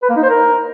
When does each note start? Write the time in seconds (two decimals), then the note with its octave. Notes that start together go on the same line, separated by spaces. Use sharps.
0.03 B4
0.10 A#3
0.16 D#4
0.23 C5
0.30 A#4